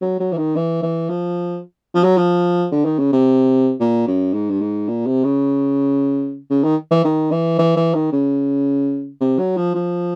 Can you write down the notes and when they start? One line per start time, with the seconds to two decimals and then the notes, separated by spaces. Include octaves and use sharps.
0.02 F#3
0.20 F#3
0.33 E3
0.37 D#3
0.56 E3
0.83 E3
1.10 F3
1.95 F3
2.04 F#3
2.18 F3
2.72 D3
2.85 D#3
2.99 C#3
3.13 C3
3.80 A#2
4.07 F#2
4.34 G#2
4.50 G2
4.61 G#2
4.88 A#2
5.07 C3
5.24 C#3
6.51 C#3
6.64 D#3
6.91 E3
7.04 D#3
7.32 E3
7.59 E3
7.77 E3
7.95 D#3
8.13 C#3
9.21 C3
9.39 F#3
9.57 F3
9.75 F3